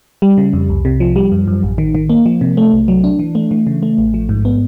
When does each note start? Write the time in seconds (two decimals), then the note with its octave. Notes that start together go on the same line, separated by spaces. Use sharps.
0.22 G3
0.38 C#3
0.53 F2
0.70 C2
0.85 C3
1.00 F3
1.16 G3
1.32 F#2
1.48 F#2
1.63 A1
1.78 D#3
1.95 D#3
2.10 A#3
2.26 F3
2.41 C3
2.57 A3
2.73 B1
2.88 F#3
3.04 D4
3.19 E3
3.35 A3
3.51 E3
3.67 C#3
3.82 A3
3.98 A1
4.14 F3
4.29 G#2
4.45 B3